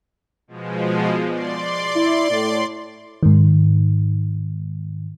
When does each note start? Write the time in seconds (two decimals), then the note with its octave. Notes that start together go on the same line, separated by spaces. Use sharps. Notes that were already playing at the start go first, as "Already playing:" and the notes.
0.48 B2 F3 G#3
1.28 D5 C6
1.95 E4
2.30 A2
3.23 G#2 D#3